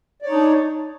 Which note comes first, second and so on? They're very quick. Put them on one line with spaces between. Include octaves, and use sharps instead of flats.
D5 C#5 D#4 D4